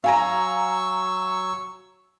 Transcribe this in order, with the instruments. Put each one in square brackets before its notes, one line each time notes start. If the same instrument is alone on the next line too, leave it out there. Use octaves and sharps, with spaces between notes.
[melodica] F#3 C#6 E6 [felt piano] F5 G#5 A#5